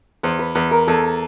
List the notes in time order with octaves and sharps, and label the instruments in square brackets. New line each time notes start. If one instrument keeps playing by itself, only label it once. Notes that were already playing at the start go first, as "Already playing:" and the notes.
[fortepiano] E2 [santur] C5
[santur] B4
[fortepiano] E2 [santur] B4
[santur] A#4
[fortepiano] E2 [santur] A4